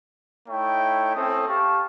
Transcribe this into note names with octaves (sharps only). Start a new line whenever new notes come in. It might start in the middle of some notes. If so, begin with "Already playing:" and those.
A3 D#4 E4 C#5 G5
C4 C#4 E4 A4 D#6
G4 F5 A5 C#6